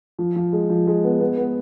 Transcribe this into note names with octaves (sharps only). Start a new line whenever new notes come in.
F3
F3
G#3
F3
G#3
B3
B3
B3